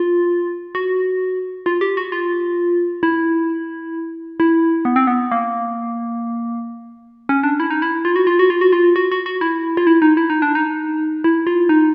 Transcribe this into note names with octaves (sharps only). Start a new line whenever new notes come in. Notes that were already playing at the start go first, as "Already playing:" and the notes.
Already playing: F4
F#4
F4
G4
F#4
F4
E4
E4
B3
C4
B3
A#3
C#4
D4
E4
D#4
E4
F4
F#4
F4
F#4
F4
F#4
F4
F#4
F#4
F#4
E4
F4
E4
D#4
E4
D#4
D4
D#4
E4
F4
D#4